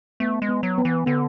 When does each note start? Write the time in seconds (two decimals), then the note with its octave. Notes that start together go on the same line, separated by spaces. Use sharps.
0.20 A3 B3
0.42 G#3
0.49 B3
0.63 F#3
0.78 B3
0.85 E3
1.06 D3 B3